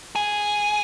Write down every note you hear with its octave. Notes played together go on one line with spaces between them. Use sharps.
G#4